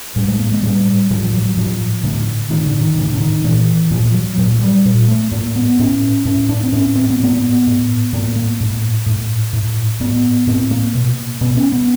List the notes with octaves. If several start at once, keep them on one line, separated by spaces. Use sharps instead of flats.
A2 G3
G#3
A#3
G#3
A2 G3
A2 F3
F3
F#3
F#3
A2 F3
A2 D3
A2 D#3
D3
D#3
A2 D3
D3
D#3
A#2 E3
A#2 F3
F#3
A#2 F#3
G3
A#2
A3
A2 A#3
B3
A2 C#4
A2 C#4
D4
C4
A2 C#4
C4
B3
A2 A#3
B3
A2
A2 A#3
A#3
A2
A2
A2
A2 B3
A2 C4
A#3
B2
B2 B3
C#4
B3